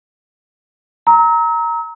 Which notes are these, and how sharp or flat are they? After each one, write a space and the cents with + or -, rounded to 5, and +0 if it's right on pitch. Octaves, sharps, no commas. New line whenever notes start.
A#5 +0 E6 -45